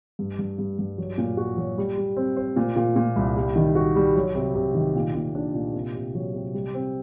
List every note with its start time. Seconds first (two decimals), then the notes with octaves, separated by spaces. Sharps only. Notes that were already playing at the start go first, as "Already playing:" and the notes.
0.19 G2
0.39 G2
0.59 G2
0.79 G2
0.98 F#3
1.18 A#2
1.37 F#4
1.57 F#3
1.78 G3
1.97 G3
2.17 C4
2.37 C5
2.56 A#2
2.76 A#2
2.96 A#2
3.16 C2
3.36 G3
3.56 D#3
3.75 F#4
3.96 G3
4.16 F#3
4.35 C3
4.55 C3
4.75 D#3
4.96 A#2
5.15 A#2
5.35 D4
5.54 A#2
5.74 C3
5.95 C3
6.15 F#3
6.34 C3
6.54 G3
6.74 C4